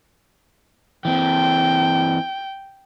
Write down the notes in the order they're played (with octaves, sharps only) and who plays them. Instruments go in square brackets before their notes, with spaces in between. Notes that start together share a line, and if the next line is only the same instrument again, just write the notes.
[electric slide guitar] E3 C4 [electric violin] G5